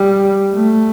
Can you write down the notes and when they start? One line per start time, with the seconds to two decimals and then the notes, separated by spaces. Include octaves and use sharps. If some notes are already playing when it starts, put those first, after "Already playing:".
Already playing: G3
0.55 A3